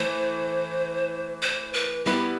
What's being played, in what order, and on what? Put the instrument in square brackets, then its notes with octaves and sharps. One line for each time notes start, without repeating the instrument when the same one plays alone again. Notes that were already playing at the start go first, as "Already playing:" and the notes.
Already playing: [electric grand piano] E3 A3 [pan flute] C5
[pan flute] C5
B4
[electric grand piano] G3 B3 E4 B4 [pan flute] G4